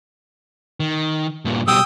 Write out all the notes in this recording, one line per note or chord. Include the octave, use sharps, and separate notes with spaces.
D#3
G2 A#2
B2 G3 G5 D#6 E6